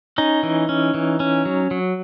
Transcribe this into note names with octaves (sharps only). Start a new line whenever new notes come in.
C#4 D#4
E3
C#4
E3
C#4
F#3
F#3